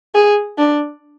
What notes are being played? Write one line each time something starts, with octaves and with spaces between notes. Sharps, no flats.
G#4
D4